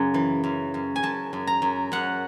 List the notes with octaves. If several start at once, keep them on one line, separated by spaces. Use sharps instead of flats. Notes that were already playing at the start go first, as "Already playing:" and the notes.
Already playing: F#2 C#3
E3
F#2
F#2
G#5
F#2 A5
F#2
A#5
F#2
F#2 F#5